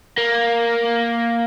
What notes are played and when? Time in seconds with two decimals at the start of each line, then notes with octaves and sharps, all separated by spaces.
0.18 A#3